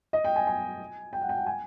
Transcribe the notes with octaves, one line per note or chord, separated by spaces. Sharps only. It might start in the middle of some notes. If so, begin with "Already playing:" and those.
D#5
G5
G#5
G#5
G5
F#5
G5
F#5
G#5